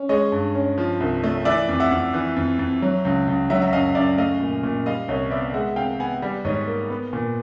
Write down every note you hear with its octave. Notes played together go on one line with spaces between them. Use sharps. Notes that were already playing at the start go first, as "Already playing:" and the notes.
Already playing: C#4
G#3 C#5 D#5
G2
C#4
F3
C2
A3
E3 D5 E5
F2
E5 F#5
F2
E3
F2
F2
F#3
C#2
C#2
F#3 E5 F#5
E5
F#2 D#5 F5
F#2 D5 E5
A3 D#5 F5
A#2
A#2
G3 D#5 F5
C2 C#5 D#5
B3 D5 E5
G#3 E5 F#5
C3 F5 G5
B3 F#5 G#5
G3
G#2 C#5 D#5
A#3
B3
A#2